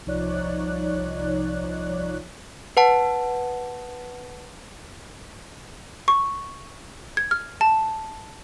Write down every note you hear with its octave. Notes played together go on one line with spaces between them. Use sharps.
C2 F3 D#4 C#5 D5 F#6
B4 F#5 A5
C#6
G#6
F6
A5